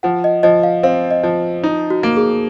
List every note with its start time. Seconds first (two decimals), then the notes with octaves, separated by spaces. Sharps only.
0.03 F3 F#5
0.24 D#5
0.43 F3 D#5
0.63 F5
0.83 C4 F5
1.11 D#5
1.23 F3
1.63 D#4
1.90 F#4
2.03 A#3
2.17 G#4